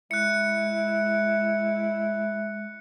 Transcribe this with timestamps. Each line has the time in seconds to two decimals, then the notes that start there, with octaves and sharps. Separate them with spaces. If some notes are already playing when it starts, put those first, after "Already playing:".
0.11 G#3 E4 F#6 C#7